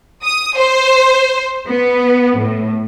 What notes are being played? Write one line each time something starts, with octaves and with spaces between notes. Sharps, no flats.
D#6
C5
B3
A2